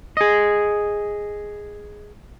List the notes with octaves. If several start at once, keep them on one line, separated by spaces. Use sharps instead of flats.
G#4 D#5